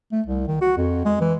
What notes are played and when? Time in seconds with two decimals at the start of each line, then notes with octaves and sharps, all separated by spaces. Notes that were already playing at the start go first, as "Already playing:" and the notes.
0.12 A3
0.26 C2
0.47 D#3
0.61 F#4
0.77 F2
1.05 G#3
1.21 E3